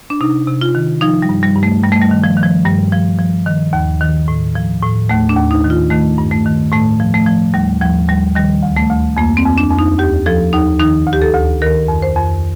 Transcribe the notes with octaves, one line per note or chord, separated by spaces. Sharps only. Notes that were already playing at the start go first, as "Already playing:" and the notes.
D4
C3 D#4
C3
F4
D#3
F3 D#4
G3
G2
G3
G2
A3
G2 G3
A3
G3
D#3
F3
D#3
F3
G2 G3
F3
F3
D#3
D#2
D#3
A2
F3
A2
D#2 A3
D4
D#2
D#4
D#3
F4
D#3 A3
G2
A3
D#3
A2 A3
F3
A3
F3
D#2 G3
D#2 F3
D#2 G3
D#3 G3
D2
A3
D2
F2 A#3
C4
F2
D4
F2
D#4
D#2 G4
F3 A4
D#2 D#4
D#3 D#4
D2
G4
A4
D2
D#3 A#4
F2
C5
F2